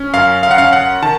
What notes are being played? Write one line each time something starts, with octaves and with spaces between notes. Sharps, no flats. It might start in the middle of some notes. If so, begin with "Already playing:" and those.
Already playing: C#4
F#2 F5
F5
F#5
C#4 F5
F#5
D#3 A5